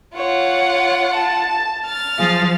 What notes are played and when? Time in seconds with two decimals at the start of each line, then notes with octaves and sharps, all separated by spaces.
0.16 F4 C#5 F#5
1.13 A5
1.86 F6 A6
2.18 F3 G#4 F5